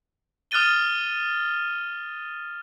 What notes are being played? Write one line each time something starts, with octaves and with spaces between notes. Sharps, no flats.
D#6 F6 F#6 A6 D#7 G7